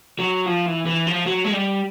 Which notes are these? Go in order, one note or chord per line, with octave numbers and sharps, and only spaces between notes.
F#3
F3
E3
E3
F3
F#3
G#3
G3